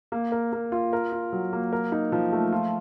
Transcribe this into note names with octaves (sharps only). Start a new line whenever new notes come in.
A#3
A#4
A#3
F4
A#4
F4
F#3
A#3
A#4
D#4
F3
A3
F4